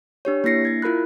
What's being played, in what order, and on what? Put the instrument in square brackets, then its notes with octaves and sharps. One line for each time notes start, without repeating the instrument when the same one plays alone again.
[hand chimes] D4 G4 C#5
A#3 D4 E4 A#6 C7 C#7
G#6 A6
E4 F4 A#4 B5 F#6